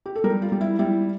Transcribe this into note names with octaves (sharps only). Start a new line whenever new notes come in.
G4
A4
G3 A#4
F4
G3
E4
G3 E4